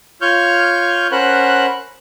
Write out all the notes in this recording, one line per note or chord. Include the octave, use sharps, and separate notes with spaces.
F4 C#5 C#6 F6 G6
C#4 A#4 C5 F#5 B5 F#6